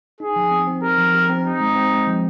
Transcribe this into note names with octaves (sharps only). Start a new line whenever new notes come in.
D#4 G#4
F3
C4
C4
G4 A#4
F3
G4
C4
C4 D#4
G#3
C4
G#3
F3